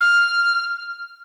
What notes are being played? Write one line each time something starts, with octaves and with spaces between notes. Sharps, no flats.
F6